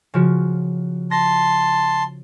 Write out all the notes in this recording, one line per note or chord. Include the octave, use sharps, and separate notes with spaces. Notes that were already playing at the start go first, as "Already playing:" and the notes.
C#3 F3 F#4
A5 C6 A#6